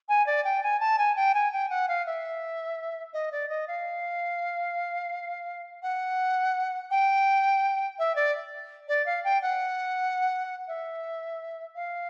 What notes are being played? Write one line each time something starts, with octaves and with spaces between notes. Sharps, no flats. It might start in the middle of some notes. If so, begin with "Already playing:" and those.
G#5
D5
G5
G#5
A5
G#5
G5
G#5
G5
F#5
F5
E5
D#5
D5
D#5
F5
F#5
G5
E5
D5
D5
F5
G5
F#5
E5
F5